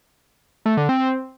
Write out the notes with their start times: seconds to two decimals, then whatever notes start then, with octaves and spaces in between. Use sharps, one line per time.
0.66 A3
0.77 D3
0.89 C4